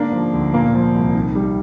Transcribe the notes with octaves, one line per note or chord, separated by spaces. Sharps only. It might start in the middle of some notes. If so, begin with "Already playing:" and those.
Already playing: G#2 D3 A#3 D4
F3
D2
A#2 A#3
F3
C2
D#3
G3